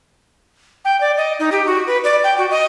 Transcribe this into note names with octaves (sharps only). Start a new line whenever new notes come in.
G5
D5
D#5
D#4
G4
F#4
B4
D5
G5
F#4
D#5